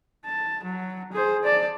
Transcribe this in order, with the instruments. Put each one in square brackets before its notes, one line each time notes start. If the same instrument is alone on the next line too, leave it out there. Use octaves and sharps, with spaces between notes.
[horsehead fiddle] A5
F#3
G#4 C5
D5 A5